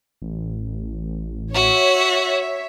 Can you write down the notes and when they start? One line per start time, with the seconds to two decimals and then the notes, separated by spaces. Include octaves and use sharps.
0.22 A1
1.54 F#4 C#5 E5